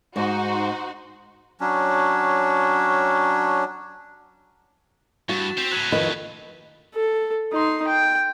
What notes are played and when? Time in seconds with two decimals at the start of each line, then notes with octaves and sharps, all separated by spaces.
0.16 G#2 D#4 F#4 C5
1.60 F#3 C#4 D4
5.29 G2 F#4 A6 E7
5.58 C4 C5 B6 E7 F7
5.72 A2 F#3 F#6 G#6 D#7
5.92 F2 D#3 B4 D#5 F#6
6.95 A4
7.52 D#4 C6
7.88 G5